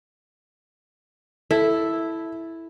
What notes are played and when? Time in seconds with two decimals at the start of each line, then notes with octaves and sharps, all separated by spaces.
1.51 E4 A4